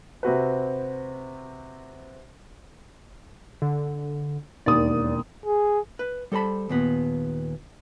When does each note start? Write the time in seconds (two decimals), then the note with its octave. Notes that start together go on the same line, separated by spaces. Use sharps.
0.23 C3 C4 F#4 B4
3.62 D3
4.66 E1 D#2 D5 D#6
5.46 G#4
5.99 B4
6.32 G3 A4 C5 A5 B5
6.69 D#2 A#2 B3